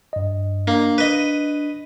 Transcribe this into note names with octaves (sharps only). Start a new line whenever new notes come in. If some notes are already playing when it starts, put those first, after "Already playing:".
G2 D#5
A#3 D4
B4 D#5